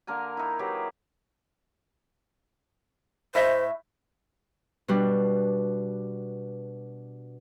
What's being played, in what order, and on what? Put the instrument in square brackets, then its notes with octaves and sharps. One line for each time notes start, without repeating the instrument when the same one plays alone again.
[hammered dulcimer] D3 A#3 A#4 G#5
D#4 E4
E3 F#3 G4 G#4
[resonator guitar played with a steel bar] A2 D#5 E5 [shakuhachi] C5
[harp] B2 G3 D4